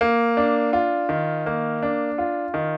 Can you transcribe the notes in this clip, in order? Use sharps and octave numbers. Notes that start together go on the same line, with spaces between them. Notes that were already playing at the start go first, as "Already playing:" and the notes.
A#3
D4
F4
D#3
A#3
D4
F4
D#3